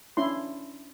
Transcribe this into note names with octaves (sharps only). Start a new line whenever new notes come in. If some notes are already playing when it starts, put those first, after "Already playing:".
C#4 D4 E4 D5 C6